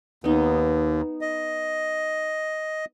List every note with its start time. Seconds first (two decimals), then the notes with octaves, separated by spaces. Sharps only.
0.24 D#2 B3 D#4
1.21 D#5